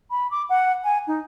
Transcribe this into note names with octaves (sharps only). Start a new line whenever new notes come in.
B5
D6
F#5
G#5
D#4